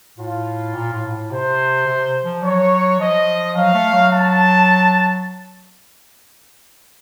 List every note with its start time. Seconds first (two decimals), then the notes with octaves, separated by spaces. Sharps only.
0.18 A2 F4
0.74 A#2
0.93 A2
1.11 A2
1.31 C3 C5
1.86 C3
2.24 F3
2.43 F#3 C#5
2.99 F3 D#5
3.56 F#3 F5
3.74 A3
3.94 F#3
4.11 A5